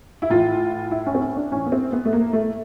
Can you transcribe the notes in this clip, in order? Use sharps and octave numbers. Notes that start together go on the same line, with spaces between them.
E4
A2 E3 F4
E4
C#4
C4
C#4
D4
A2 E3 C#4
B3
C4
B3
A3
A#3
A3